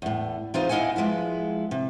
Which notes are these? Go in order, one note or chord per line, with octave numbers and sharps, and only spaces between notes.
E2 A2
E3 D#4 F4 G#4 C5 D#5
E2 E4 D#5 F5 F#5 G#5
F3 G#3 B3 E4
C3